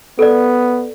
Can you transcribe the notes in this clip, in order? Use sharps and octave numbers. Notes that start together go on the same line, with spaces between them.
B3 A4 D5